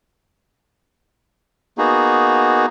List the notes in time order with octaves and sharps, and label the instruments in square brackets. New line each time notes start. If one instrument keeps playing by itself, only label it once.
[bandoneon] A#3 B3 D#4 F#4 G#4